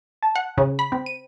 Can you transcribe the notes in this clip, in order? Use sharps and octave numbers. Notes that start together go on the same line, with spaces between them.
A5
F#5
C#3
B5
C4
D#7